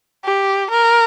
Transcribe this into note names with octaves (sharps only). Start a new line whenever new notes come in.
G4
A#4